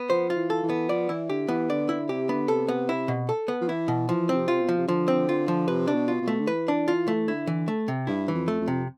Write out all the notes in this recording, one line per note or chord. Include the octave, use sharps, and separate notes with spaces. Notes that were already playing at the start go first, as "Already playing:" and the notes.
Already playing: B3
F3 C5
F4
E3
A4
E3
B3
F3 D5
E3 E4
D3 G4
E3 B3
D3 D5
D3 E4
C3 G4
D3 B3
C3 A4
B3
E4
B2
A4
B3
F3
E3 E4
B2
E3 F3
C4
C3
F4
B2
F3
C3
D3 F3
C4
F4
F3
C3 B4
D4
B2
F4
B2
A3
D3
E3 B4
D4
F4
A3
D3 E4
E3
A3
C3
G2 E4
E3
F2
A3
F2
C3